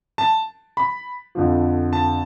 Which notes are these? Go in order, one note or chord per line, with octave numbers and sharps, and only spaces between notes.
A5
B5
F2 D3 F3
A5